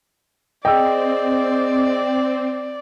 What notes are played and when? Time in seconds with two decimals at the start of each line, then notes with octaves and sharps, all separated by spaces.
0.65 C4 G#4 D5 D#5 G5 E6